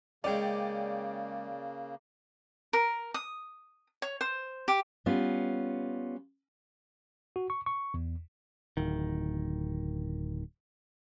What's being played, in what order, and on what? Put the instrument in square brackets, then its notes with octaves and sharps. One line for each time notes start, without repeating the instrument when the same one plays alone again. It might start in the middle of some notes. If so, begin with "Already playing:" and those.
[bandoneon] C#3 A#3 [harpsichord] G#3 C#4 [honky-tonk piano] D5 G5
[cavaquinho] A#4
D#6
C#5
C5
G4
[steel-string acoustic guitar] G3 B3 C#4 F4
[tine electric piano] F#4
C#6
C#6
E2
[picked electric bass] D1 D#3